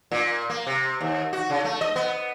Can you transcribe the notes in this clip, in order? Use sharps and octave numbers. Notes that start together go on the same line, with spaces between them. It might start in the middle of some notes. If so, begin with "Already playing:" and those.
A#2
A#3
C3
D#2
F#4
C#3
A3
D#5
B3